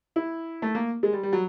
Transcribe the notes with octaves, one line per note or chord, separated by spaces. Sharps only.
E4
A3
A#3
G#3
G3
G3
F#3